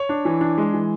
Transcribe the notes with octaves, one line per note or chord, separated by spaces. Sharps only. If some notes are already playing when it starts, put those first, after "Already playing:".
Already playing: C#5
D4
E3
D4
G#3
E3